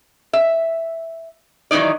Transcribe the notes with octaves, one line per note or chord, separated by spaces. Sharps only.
E5
D#3 E3 F#3 D#4 D5